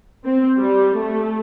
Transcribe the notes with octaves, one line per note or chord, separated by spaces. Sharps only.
C4
G3
A3